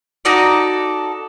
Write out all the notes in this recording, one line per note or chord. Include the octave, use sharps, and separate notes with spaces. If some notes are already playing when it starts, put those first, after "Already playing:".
D#4 F#4 A4 D5